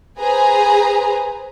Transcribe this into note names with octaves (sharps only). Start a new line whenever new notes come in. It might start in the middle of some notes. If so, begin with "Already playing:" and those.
G#4 B4 C5 G#5 A#5